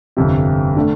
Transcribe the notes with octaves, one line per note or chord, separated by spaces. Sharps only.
G1 F2 C3
D3 A3